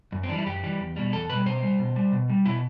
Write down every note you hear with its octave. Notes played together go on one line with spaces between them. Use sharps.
F#2
C4
E3 G3 D4
E4
F#2 G4
E3 G3
E2
B2 G3
E2 A4
B2 G3 B4
B2 C5
G3
B2
G3
B2
G3
B2 E4